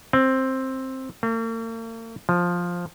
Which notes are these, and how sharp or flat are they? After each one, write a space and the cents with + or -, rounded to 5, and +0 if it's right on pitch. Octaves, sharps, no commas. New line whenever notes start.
C4 +10
A#3 -45
F3 +5